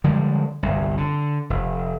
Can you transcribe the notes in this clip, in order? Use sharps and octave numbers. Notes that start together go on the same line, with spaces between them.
D3 F3 G3 G#3
G1 C2
D3
F1